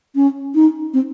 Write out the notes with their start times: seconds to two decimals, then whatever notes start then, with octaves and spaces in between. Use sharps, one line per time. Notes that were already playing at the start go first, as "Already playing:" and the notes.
0.15 C#4
0.55 D#4
0.94 C4